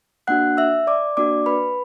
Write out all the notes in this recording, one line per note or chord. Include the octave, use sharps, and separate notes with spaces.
A#3 D4 F#4 F#5 F#6
E5 E6
D5 D6
A#3 D4 F#4 D5 D6
B4 B5